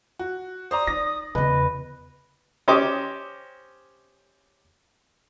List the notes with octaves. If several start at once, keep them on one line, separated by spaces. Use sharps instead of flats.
F#4
C5 D5 A#5 D#6
D#4 D5 A#6
E2 C#3 B4 D#5
C#4 G4 C5 D#5 D6